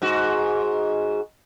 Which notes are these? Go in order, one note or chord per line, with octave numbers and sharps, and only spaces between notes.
G#2 F#4